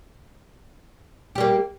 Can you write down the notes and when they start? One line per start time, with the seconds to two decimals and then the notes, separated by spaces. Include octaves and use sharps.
1.35 G4
1.38 G3
1.40 A#3